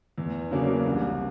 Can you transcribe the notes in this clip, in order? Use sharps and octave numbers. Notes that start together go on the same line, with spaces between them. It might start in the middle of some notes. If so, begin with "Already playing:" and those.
E2
C#3 F#3 A#3 D4
C2